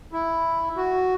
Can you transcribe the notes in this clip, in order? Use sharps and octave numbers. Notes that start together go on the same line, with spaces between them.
E4
F#4